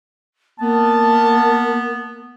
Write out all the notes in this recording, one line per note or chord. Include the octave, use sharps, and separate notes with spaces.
A#3 B3 A5